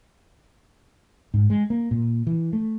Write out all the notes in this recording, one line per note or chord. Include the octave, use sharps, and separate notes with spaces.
G#2
G#3
A#3
A#2
E3
A3